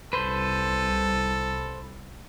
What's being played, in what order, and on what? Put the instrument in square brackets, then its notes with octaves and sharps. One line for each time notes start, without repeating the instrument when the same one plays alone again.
[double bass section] C2 [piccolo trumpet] A4 [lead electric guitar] B4 C5